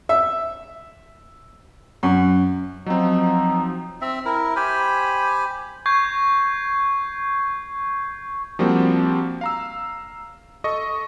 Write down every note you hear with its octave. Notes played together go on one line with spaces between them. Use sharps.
E5
F#2
F3 F#3 C4 D#4
C4 E5
E4 A#4
G4 C5 G#5 B5
C#6 G6 G#6 C7
F3 G3 A#3 C4 D4 F#4
F5 A#5 E6
A4 D#5 C#6